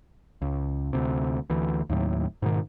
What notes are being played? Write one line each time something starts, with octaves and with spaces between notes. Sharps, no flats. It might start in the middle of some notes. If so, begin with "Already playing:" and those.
C#2
D2 C3
D2 E3
D#2 A2 F#3
G#2 B2 D#3